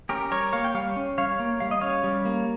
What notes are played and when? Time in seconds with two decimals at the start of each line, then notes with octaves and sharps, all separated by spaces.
0.09 C#4 G4 A#4
0.31 G3 A#4 C#5
0.53 A#3 C#5 F5
0.64 G5
0.74 G3 C#5 F5
0.96 C#4
1.18 G3 C#5 F5
1.40 A#3
1.60 G3 F5
1.71 D#5
1.81 C#4 C#5 F5
2.04 G3
2.25 A#3